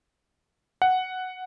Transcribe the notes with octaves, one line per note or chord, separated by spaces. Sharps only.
F#5